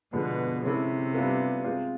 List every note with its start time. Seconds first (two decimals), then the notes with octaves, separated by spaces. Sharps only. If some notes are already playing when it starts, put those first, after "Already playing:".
0.13 B2 D3 F3 G#3 B3
0.63 C3 G#3 C#4 E4 A4
1.14 G3 B3 D4 F4 A4
1.64 G#3 C4 F4